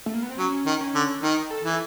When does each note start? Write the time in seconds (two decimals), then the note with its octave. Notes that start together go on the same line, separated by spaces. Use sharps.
0.06 A3
0.14 A#3
0.22 B3
0.30 C4
0.38 F#3 C#4
0.66 D#3
0.81 C#4
0.94 D3
1.23 D#3 D#4
1.51 A4
1.64 E3